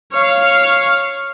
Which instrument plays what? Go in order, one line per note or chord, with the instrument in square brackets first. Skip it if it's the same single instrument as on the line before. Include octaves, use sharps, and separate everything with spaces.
[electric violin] C#5 F5